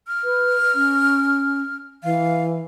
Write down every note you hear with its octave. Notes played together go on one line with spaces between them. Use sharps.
F6
B4
C#4
E3 F5